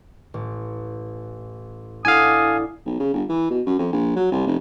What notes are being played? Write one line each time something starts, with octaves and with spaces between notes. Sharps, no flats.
A1
D4 E4 A4 F5 F#5 G#5 D#6
B1
C#3
G1
E3
B2
F#2
F2
A#1
F#3
C2
F1